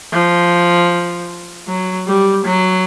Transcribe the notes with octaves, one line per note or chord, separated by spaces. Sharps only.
F3
F#3
G3
F#3